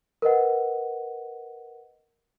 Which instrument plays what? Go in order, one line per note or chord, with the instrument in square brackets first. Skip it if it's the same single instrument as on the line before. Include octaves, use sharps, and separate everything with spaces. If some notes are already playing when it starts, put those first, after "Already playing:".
[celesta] A#4 B4 D#5 F#5